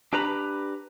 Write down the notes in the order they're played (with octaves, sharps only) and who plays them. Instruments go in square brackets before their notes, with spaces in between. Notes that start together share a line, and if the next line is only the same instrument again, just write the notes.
[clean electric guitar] D4 G4 B4 A#5 B5